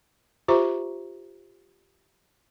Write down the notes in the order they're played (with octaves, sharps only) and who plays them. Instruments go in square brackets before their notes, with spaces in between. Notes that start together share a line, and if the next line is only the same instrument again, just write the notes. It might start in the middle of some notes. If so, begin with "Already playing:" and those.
[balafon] F4 G4 C5 E5 A#5 C#6